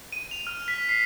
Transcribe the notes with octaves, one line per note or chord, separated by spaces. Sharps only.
D#7
F7
F6
B6
C7